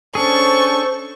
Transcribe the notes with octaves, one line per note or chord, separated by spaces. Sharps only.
C#4 D4 G#4 A4 C5 C#6